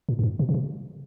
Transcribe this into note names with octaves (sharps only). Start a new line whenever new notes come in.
A2
F#2
G2
B2
C3
B2